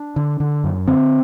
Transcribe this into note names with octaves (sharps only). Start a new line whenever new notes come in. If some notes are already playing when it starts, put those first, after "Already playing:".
Already playing: D4
D3
D3
F#2
D3 C4